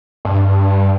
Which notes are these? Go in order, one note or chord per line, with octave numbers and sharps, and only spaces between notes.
G2